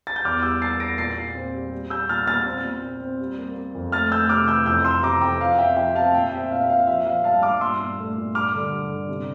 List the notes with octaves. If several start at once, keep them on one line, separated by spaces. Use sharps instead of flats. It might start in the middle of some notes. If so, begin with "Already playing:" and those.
A6
G6
E2 D6 F6
G3 E6 G6
A#3 A6 C7
A#3 A#6 D7
A#2 A6 C7
A#2
C4
G3
G3
G3 E6 G6
A#2 F6 A6
A#2 F6 A6
C4
A#2
C4
C4
G3
A#3
A#3
F2
A3 F6 A6
A3 E6 G6
C3 D6 F6
E3 E6 G6
F2 E6 G6
F2 C6 E6
C3 A#5 D6
F2 G5 A#5
F3 F5
C4 E5 G5
F3 E5 G5
C4 F5 A5
A#2 E5 G5
C4 E5 G5
A#2 F5
E5
A#2 F5
F3 E5
F3 F5
G2 F5 A5
G2 D6 F6
A#2 C6 E6
A#2
A3
A#2
G2 D6 F6
D3
G2
D3
C3